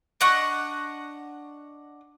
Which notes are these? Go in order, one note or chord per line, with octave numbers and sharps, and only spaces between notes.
D4 D#5 F#5 C#6